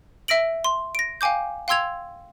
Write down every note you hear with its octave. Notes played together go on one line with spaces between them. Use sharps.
E5 E6 A#6 D7 F#7
C6
A#6 D7
F5 G5 G#5 D6 G6
F5 G5 C6 E6 G#6 F7